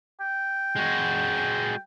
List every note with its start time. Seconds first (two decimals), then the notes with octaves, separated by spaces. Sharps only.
0.20 G5
0.76 G#3 F#4